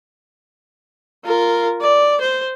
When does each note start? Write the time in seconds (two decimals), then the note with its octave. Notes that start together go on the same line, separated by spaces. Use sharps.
1.25 F4 A#4
1.81 D5
2.21 C5